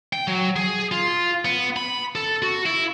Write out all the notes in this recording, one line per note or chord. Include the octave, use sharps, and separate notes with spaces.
G5
F#3
G#4
F4
B3
B5
A4
F#4
E4